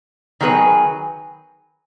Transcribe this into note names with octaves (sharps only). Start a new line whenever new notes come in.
D#3 F#3 B3 G#4 B4